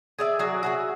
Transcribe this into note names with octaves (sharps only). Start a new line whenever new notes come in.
G#4 D5 E5
F#3 F#4 G#4 D5
F#4 G#4 E5